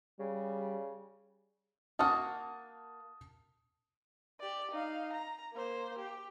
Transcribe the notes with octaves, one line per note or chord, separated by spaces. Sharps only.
C#3 G3
A#3 F#4 A5 D#6 F6
G4 D5
D#4 F5
A#5
A#3 C5
G4